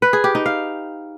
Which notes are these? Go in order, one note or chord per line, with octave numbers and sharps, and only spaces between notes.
B4
G#4
G4
D#4
F5